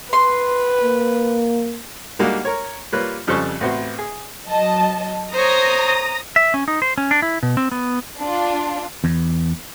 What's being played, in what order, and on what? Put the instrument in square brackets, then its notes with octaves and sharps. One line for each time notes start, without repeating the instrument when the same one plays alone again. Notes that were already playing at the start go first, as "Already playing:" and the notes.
[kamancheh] B4 [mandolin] C6
[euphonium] A#3
[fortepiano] G3 G#3 A#3 D4 D#4 F#4
A#4 C#5
G3 A#3 F4 B4 C#5
F2 C#3 G3 A4 C5 C#6
A1 B3 C4 F#4 C5
G#4
[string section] F#3 D#5 A5
[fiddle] C5 C#5 [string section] A#5 D#6 A#6
[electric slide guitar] E5
C#4
D#4
C5
C#4
D4
E4
B2
C4
B3
[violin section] D4 F4
[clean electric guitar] E2